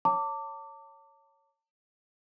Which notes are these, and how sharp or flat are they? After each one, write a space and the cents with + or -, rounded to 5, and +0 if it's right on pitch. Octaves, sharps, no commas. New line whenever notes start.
C#5 +0 A5 +35 D6 -10